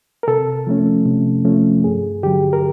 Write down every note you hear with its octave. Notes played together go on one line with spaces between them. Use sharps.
A#4
C3 A4
F3 A3 C#4
C3
F3 A3 C#4
G2 G#4
D3 F#3 G4
A#4